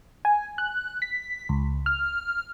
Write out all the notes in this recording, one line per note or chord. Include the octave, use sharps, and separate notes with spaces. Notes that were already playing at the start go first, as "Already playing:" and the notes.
G#5
F#6
B6
C#2
F6